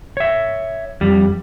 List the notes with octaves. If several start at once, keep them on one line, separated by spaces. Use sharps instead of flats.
C#5 E5
F2 G3